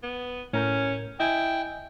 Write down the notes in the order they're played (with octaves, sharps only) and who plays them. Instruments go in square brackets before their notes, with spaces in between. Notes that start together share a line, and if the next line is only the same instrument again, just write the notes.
[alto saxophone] B3
[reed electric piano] A2 A#4 G6 [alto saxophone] C#4
[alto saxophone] E4 [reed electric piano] D#5 G#5 [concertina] G5